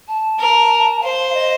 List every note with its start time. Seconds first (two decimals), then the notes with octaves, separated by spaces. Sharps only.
0.08 A5
0.39 A#4
1.03 C5 F5
1.34 D#5